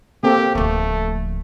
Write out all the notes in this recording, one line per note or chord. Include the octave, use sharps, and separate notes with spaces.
A#3 C4 G4 A4
D1 F3 A3